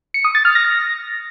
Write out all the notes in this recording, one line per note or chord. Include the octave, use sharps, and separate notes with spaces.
C#7
D#6
A6
F6
A#6